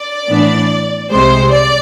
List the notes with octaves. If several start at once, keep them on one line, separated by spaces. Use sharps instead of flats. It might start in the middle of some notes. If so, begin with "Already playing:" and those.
Already playing: D5
A2 E3 B3 D4
C2 C3 G#3 C5
D5